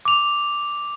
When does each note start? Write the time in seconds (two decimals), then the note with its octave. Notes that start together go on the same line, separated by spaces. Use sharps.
0.05 D6 F7